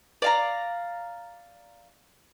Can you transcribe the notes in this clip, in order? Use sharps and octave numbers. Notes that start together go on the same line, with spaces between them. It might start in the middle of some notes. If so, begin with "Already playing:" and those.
D5 F5 A#5